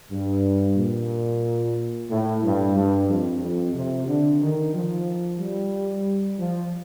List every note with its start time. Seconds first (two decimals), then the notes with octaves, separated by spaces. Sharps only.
0.12 G2
0.77 A#2
2.10 A2
2.43 G2
2.76 G2
3.09 F2
3.42 F2
3.75 C3
4.08 D3
4.41 D#3
4.74 F3
5.40 G3
6.39 F3